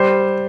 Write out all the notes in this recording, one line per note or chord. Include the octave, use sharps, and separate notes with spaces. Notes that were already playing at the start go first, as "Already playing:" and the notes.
Already playing: G3 C5